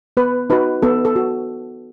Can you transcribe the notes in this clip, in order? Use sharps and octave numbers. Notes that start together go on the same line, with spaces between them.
B3 B4
D#4 F#4 B4
B3 A4
A4
F#4